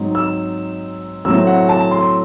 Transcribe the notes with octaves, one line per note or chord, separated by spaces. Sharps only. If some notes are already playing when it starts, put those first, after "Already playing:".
Already playing: G#2 F#3 C4 D#4
E6
A2 F#3 A3 C4 E6
F#5
A5
C6